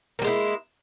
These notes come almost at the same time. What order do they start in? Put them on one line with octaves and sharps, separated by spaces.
A#3 G3 G#3 E4